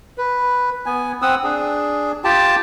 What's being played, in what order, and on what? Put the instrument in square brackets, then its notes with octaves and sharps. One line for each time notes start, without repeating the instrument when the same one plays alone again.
[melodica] B4
B3 G#5
C4 F#5 D#6 E6
D4 G#4
F4 G4 G5 A5